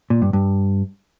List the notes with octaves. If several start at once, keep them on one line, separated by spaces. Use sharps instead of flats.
A#2
G2
G2